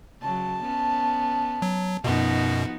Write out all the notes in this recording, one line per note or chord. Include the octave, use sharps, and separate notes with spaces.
C#3 F#3 A5
B3 C#4
F#3
F#2 B2 F3 B3 D#4 F#4